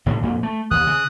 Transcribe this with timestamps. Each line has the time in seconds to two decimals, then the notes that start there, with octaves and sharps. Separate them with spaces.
0.06 C2 A2 D#3
0.22 F2 A#2
0.43 A3
0.71 D#2 D#6 F#6
0.87 C#3